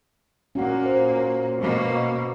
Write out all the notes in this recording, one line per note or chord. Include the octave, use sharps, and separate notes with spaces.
A#2 A#3 C#4 F#4 F#5
C5
C#5
B2 A#3